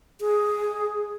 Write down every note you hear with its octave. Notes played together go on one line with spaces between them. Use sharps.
G#4